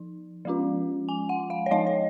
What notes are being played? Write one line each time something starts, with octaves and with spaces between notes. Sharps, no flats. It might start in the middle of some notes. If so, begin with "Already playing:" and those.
Already playing: F3 D#4
F3 G#3 C#4 F4
G#5
F#5
F5
C#5
F3 G#3 D#4 D#5
C#5